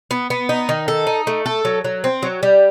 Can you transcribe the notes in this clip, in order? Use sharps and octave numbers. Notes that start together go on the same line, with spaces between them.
B3
B3
D#4
D#3
A4
D#4
A3
A4
F#3
F#3
C4
F#3
G3